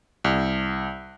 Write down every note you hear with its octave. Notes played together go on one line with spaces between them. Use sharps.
C2